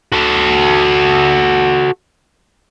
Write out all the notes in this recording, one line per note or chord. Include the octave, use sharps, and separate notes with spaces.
F#4 A4